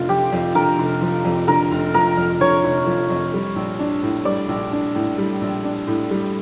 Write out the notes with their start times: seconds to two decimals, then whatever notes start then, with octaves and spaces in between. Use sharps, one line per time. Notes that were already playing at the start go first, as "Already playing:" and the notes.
Already playing: F1 D3 F4
0.09 F3 G4
0.32 F2
0.55 D3 A#4
0.78 F1
1.02 F3
1.25 F2
1.48 D3 A#4
1.71 F1
1.94 F3 A#4
2.17 F2
2.40 D3 C#5
2.64 F1
2.87 F3
3.10 F2
3.33 G3
3.56 A#1
3.79 D4
4.03 A2
4.25 G3 D5
4.49 A#1
4.72 D4
4.95 A2
5.18 G3
5.41 A#1
5.64 D4
5.87 A2
6.11 G3